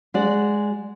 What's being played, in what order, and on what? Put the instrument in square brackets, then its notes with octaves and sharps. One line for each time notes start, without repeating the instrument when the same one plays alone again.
[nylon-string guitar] G#3 F#4 D5